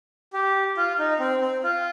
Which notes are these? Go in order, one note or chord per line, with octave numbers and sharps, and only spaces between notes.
G4
F4
D#4
C4
C4
F4